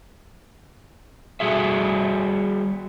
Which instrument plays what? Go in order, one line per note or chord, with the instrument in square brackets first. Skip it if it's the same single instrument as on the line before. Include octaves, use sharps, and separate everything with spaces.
[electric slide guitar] G3 F#4 G#4 E5